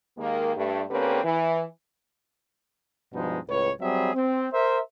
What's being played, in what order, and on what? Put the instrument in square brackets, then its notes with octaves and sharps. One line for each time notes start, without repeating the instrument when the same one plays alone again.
[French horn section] D#2 D#3 G#3 A#3
G2 A3
D3 A#3 C4 C#4 G4 B4
E3
[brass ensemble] G2 B2 F3 G#3 D#4
C#2 A2 B4 C#5
F#3 G3 C4 G#4 E5
C4
A#4 C5 E5